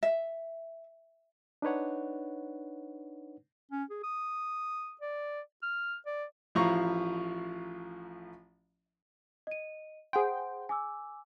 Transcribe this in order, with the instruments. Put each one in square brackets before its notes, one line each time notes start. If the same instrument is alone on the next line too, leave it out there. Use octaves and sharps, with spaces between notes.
[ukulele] E5
[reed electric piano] D4 D#4 B4 C#5 F#5
[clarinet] C#4
G#4
D#6
D5
F6
D5
[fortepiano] A1 F3 E4 F5 A#5 C#6
[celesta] D#5 D#7
[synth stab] G#4 G5 [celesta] C5 F#5 C6
[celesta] G#5 D6 E6